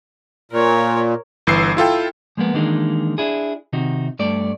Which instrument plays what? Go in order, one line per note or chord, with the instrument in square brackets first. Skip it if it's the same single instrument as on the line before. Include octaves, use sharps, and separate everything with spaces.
[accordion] A#2 [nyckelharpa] A#4 C#5
[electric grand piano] G1 E3 E6 C7
E4 F4 A4 G5
[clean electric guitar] F3 G#3 A#3 B3
D#3 E3 G#3 A#3 D4 D#4
D4 E4 G#4
C3 D#3 D#4 F#4
G2 A3 D5